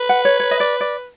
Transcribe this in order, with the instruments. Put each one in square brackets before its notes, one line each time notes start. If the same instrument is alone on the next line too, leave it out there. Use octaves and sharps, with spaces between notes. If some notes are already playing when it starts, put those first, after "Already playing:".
Already playing: [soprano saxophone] B4
[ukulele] F#5
C#5
C#5
D#5
D5
D5